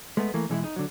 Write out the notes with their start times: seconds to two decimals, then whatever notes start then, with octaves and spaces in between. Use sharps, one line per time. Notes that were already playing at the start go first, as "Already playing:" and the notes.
0.17 G#3 A3 B3
0.34 E3 A3 A#3
0.49 B2 E3 G#3 E4
0.64 D#4
0.76 D3 F#3